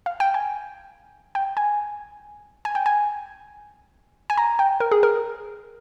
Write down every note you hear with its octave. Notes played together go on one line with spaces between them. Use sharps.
F5
G5
G#5
G5
G#5
G#5
G5
G#5
G#5
A#5
G5
A#4
G#4
A#4